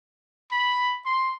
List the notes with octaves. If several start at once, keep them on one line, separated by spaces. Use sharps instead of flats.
B5
C6